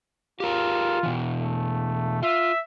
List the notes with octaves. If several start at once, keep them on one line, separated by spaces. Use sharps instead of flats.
F4 G4 G#4 A#4
B2 E3
A3
F4 E5